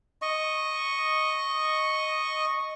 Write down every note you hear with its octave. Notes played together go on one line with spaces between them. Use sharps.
D#5 C#6